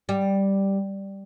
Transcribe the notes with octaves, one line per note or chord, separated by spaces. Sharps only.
G3